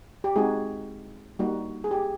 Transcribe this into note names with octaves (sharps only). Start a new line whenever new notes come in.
G4
G#3 C4 D#4 F#4 G#4
G3 A#3 D#4 F#4
G#4
G4